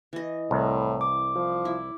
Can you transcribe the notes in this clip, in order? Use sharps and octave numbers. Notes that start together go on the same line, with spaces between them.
E3 D#5
C2 A2
D6
F3
E4